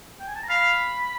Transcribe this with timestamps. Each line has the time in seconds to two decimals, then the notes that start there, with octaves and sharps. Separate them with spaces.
0.20 G5
0.28 G#5
0.35 A5
0.43 A#5
0.49 F5 B5